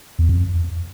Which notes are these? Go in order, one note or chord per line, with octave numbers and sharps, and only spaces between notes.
E2
F2